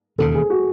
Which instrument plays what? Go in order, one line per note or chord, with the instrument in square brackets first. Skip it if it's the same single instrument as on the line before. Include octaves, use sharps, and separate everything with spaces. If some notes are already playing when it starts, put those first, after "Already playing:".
[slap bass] E1 D#2 C#3 [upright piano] A4
[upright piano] G#4
F#4